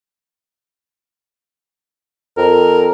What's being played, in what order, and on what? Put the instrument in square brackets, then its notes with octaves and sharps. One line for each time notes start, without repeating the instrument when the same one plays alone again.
[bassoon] F2 [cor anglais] A#4